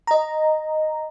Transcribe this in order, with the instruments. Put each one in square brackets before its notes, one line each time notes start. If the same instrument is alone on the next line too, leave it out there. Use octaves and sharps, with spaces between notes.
[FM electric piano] D#5 A#5